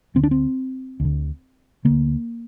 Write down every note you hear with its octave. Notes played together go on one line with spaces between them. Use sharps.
D2 D3 C4
D4
C4
D2
D3
D2 D3 A#3